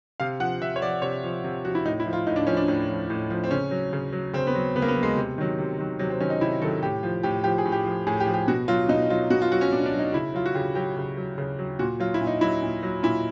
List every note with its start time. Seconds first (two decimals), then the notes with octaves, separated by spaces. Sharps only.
0.20 C3 F5
0.40 F3 F#5
0.61 C3 E5
0.76 C#5
0.82 F3 D5
1.02 C3 C#5
1.23 F3
1.44 C3
1.64 F3 F#4
1.75 E4
1.85 A2 D#4
2.00 E4
2.06 F3
2.13 F4
2.27 A2 D#4
2.36 D4
2.47 F3 C#4
2.57 D4
2.68 A2
2.89 F3
3.10 A2
3.30 F3
3.44 C4
3.51 C#3 C#4
3.71 F#3
3.93 C#3
4.12 F#3
4.33 C#3 C4
4.47 B3
4.55 F#3
4.75 C#3 B3
4.82 A#3
4.88 B3
4.96 F#3
5.03 G#3
5.16 C3
5.38 D#3 F#3
5.58 C3
5.78 D#3 F#3
5.99 C3 F#3
6.10 C4
6.20 D#3 F#3 C#4
6.30 D#4
6.40 C3 E4
6.61 D#3 A4
6.64 F#3
6.82 A2 G4
7.03 F3
7.23 A2 G4
7.44 F3 G4
7.58 G#4
7.65 A2
7.72 G4
7.86 F3
8.07 A2 G#4
8.20 G4
8.27 F3
8.34 G4
8.48 B2 F#4
8.68 F#3 F4
8.89 B2 D#4
9.10 F#3 F4
9.30 B2 F#4
9.42 F4
9.52 F#3 F#4
9.61 C#4
9.72 B2 D4
9.86 D4
9.93 F#3
9.99 D#4
10.13 C#3 E4
10.34 F#3 F4
10.46 F#4
10.54 C#3 G4
10.75 F#3 G4
10.97 C#3
11.17 F#3
11.38 C#3
11.59 F#3
11.79 A#2 F#4
12.00 F#3 F4
12.14 E4
12.21 A#2
12.27 D#4
12.41 F#3 E4
12.62 A#2
12.83 F#3
13.03 A#2 E4